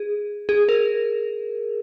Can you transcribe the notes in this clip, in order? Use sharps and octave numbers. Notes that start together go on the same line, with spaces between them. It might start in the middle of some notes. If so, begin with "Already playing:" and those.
Already playing: G#4
G#4
A#4